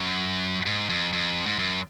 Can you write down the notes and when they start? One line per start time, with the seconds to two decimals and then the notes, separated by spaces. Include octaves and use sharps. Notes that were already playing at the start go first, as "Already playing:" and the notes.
Already playing: F#2
0.66 G#2
0.90 F2
1.13 F2
1.46 G#2
1.59 F#2